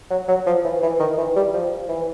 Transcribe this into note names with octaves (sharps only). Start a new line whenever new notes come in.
F#3
F#3
F3
E3
E3
D#3
E3
G3
F3
E3